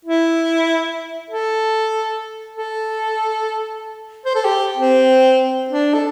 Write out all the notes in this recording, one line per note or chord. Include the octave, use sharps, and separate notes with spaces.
E4
A4
A4
C5
A4
G4
C4
D4
A4